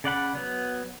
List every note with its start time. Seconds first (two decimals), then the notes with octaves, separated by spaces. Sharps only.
0.04 C#3 D5 F#5 B5
0.35 F#3 B3